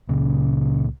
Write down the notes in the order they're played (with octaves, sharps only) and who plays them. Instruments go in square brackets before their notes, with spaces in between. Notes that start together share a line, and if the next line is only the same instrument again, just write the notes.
[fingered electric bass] C#2 A#2 [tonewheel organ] C#3